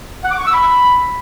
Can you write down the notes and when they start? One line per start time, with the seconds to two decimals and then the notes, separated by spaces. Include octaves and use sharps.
0.24 F#5
0.31 D6
0.39 C#6
0.46 E6
0.53 B5